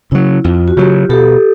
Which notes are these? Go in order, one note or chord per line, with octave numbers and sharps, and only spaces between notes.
C#3 F#3 E4
F2 F4
F#4
C#3 F#3 F4 G4
B2 G4 A4